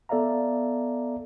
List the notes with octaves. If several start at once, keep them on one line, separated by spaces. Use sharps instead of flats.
B3 A4 D5 E5 F5 A#5